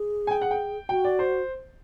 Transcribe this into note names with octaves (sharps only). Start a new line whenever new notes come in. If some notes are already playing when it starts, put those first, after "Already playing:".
Already playing: G#4
G#5
G5
F#5
G5
F#4 G5
D5
C5